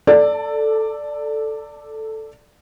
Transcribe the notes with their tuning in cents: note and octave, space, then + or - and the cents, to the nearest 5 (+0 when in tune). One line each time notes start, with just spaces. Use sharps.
A4 +0 D5 +0 A5 +45